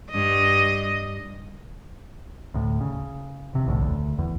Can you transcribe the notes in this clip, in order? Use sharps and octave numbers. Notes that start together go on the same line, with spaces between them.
G2 D#5
D2 A2
C#3
E1 C3
B1 E2 A2 D3
D2
E2